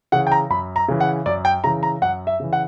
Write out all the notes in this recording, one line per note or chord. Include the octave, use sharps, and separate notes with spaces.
C#3 E3 F#5
G5
A#5
F#2 B5
A#5
C#3 E3
F#5
F#2 D5
G5
C#3 E3 A#5
A#5
F#2 F#5
E5
C#3 E3
F#5